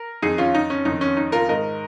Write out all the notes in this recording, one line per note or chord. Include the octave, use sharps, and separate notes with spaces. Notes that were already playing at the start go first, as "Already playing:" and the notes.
Already playing: A#4
F2 D#3 D#4 G#4
C#4 F4
D#4
C#4
F2 D#3 D#4
C#4
D#4
F4 A#4
G#2 D#3 A#4 D#5